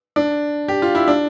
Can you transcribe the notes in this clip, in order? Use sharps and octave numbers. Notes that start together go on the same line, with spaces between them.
D4
G4
F4
E4
D4